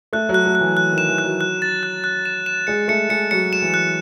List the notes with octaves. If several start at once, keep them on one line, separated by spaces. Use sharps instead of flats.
A3 F#6
F#3
F#6
A3
F#6
E3
F#6
D#3
E7
E3
F#6
F#3
F#6
A6
F#6
F#6
E7
E7
G#3 C#7
A3 C#7
G#3 C#7
F#3 C#7
E7
E3
F#6